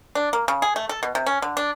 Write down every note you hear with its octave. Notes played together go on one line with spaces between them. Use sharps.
D4
A#3
C#3
G#4
A3
A4
B2
C3
C#4
D3
D4